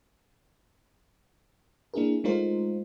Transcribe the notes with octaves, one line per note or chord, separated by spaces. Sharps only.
A#3 D4 E4 G#4 A#4
G#3 A3 D#4 F4 A#4 C5